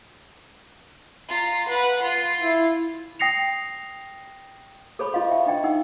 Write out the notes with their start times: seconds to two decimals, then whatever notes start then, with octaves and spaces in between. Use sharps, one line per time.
1.29 F4 A#5
1.68 B4 F#5
2.02 F4
2.41 E4
3.20 G5 D#6 A#6 C7 C#7 F7
4.99 G#4 A4 C5 C#5 B5 C#6
5.13 F4 D#5 F5 C6
5.29 E5 G5
5.46 D4 D#5 G5
5.64 D#4 F#5 E6